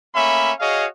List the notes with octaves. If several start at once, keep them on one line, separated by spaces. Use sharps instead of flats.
A3 A#3 C#4 E5 B5
F#4 G#4 C#5 D#5 F5